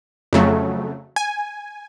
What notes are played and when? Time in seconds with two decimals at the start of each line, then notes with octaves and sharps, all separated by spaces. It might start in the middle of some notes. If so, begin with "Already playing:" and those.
0.33 F2 C#3 F#3 A3
1.16 G#5